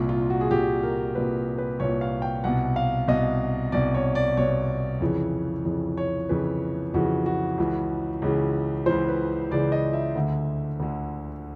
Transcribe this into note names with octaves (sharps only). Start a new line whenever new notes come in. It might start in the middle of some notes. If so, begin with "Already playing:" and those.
Already playing: C2 A#2
F4
F#4
G#4
C2 A#2 G4
A#4
C2 A#2 B4
B4
C2 A#2 C#5
F5
G5
C2 B2 F#5
F5
C2 B2 D#5
C2 B2 D5
C#5
D5
C2 B2 C#5
F2 C#3 E3
F2 C#3 E3
C#5
F2 C#3 E3 B4
F2 C#3 E3 F#4
F#4
C#2 C#3 E3
C#2 C#3 E3
C#2 C#3 E3 C5
B4
C#2 C#3 E3 D5
D#5
E5
D2 D3
D2 D3